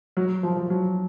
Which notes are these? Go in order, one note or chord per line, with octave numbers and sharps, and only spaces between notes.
F#3
F3
F3
F#3